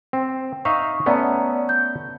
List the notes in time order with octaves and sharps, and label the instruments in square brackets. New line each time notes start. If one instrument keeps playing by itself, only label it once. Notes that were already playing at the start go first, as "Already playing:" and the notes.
[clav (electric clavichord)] C4
[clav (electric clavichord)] D#4 E5 F5 [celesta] C#6
[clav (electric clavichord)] A3 B3 C#4 [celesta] D5 A#5
[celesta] G6